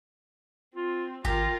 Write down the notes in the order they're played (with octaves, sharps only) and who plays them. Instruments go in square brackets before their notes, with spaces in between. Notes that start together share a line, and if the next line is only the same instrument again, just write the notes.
[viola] C4 [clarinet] F4
[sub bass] G#1 [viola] F4 A#4 [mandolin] G4 [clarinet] A#5